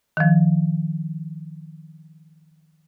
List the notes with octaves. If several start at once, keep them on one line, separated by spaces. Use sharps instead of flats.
D#3 F3